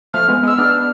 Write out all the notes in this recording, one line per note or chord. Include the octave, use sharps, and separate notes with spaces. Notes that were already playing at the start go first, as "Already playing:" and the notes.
F3 A3 F6
G#3 B3
G#3 B3
E6
B3 D4 F6